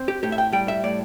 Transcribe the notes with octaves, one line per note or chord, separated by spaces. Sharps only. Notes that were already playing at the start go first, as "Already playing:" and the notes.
Already playing: C4
G4
A2 G4
E5
G5
G3 G5
E5
A2 D5